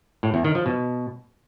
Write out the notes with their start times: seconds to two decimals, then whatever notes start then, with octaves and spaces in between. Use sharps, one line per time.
0.23 A2
0.34 E2
0.44 D#3
0.55 F3
0.66 B2